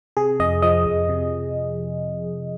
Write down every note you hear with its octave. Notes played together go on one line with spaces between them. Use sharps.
C3 G#4
F2 D#5
F3 D#5
F2
C3